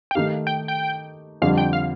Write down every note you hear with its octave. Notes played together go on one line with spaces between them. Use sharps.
G5
D#3 A3 D#4 G4 F5
G5
G5
F2 D3 G3 F5
G5
F5